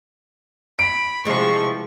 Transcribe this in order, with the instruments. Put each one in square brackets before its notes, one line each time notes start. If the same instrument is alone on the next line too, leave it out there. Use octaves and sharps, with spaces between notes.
[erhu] B5 [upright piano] D7
[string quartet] C3 F3 [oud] E3 G#3 [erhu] C#6